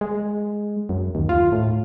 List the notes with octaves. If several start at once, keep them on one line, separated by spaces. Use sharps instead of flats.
G#3
F#2
D#2
F4
A2